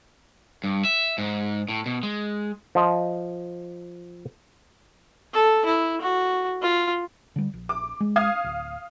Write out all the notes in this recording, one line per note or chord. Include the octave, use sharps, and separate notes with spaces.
G2
E5
G#2
A2
B2
G#3
F3 D#5
A4
E4
F#4
F4
D3 G3
A#1
D6
G#3
F5 D#6 G#6
D1